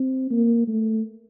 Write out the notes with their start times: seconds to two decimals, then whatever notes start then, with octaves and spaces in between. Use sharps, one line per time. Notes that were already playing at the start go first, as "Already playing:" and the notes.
Already playing: C4
0.31 A#3
0.68 A3